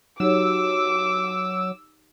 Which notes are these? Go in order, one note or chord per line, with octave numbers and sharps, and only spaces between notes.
F#3 D#4 G4 C#5 D6 E6